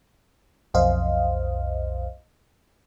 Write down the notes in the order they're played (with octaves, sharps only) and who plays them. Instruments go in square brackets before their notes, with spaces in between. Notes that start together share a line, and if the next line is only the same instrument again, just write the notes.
[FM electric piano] B1 F2 C5 D#5 F5